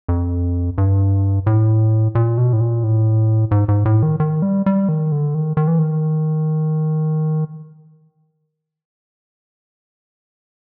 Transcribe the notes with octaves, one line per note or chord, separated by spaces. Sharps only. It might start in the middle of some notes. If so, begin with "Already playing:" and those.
F2
G2
A2
A#2
B2
A2
A#2
A2
G#2
G#2
A2
D#3
D#3
G3
G3
D#3
D3
D#3
D#3
E3
D#3